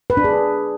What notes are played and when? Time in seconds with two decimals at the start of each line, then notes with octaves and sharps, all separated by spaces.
0.10 B4
0.17 D4
0.24 G#4